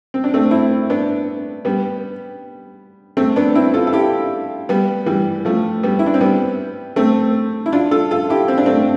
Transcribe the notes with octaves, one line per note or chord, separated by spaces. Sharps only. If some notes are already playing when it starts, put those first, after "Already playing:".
C4
D4
A3 C4
C4 E4
B3 D4
G3 B3
A3 C4
B3 D4
C4 E4
F4 A4
A4
E4 G4
G3 B3
E3 G3
F3 A3
G3 B3
E4
D4
C4
G3 B3
A3 C4
E4
D4 F4
F4 A4
F4 A4
E4 G4
C4
D4
A3 C4